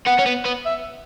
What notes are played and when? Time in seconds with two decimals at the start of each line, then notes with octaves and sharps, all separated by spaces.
0.06 B3 F#5
0.19 C#4
0.26 B3
0.45 B3
0.66 E5